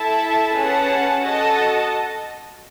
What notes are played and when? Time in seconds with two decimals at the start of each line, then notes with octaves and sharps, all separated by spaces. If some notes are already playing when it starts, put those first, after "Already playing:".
Already playing: E4 A4 E5 A5
0.55 C#4 G#4 B4 F#5 A5
1.21 F#4 A4 D#5 A5